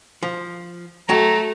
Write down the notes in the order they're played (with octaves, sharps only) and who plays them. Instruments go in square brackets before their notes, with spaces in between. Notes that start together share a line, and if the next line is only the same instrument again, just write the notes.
[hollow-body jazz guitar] F3
[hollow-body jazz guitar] F#3 G5 A5 [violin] A3 [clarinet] A#5